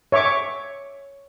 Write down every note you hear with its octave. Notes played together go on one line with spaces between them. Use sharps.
C#5 E5 C#6 D6